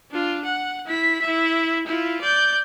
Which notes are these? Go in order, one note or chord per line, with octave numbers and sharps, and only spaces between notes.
D4 F4
F#5
E4 B6
E4 E5
E4 F4
D5 G6